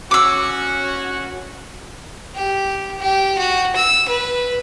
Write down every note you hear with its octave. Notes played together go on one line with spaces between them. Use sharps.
C#4 F#4 D6 E6
G4
G4
F#4
E6
B4